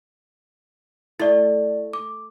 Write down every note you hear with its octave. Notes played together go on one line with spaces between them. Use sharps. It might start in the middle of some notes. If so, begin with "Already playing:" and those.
A3 E4 D5
D6